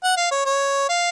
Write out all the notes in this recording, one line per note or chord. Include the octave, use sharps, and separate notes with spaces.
F#5
F5
C#5
C#5
F5